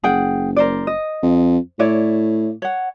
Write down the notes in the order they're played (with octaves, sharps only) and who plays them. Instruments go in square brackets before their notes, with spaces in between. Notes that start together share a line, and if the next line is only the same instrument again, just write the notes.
[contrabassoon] F#1 [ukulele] G#4 F#5 G5
[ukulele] A#4 C5 D5
D#5
[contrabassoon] F2
[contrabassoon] A2 [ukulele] E4 C#5 D5
[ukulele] C#5 F#5